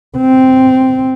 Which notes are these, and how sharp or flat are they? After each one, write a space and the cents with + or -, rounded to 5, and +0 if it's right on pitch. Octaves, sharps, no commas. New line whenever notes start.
C4 -5